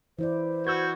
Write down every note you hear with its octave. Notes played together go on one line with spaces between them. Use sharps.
E3 E4 C5 D5
F#4 B4 E6 G6 G#6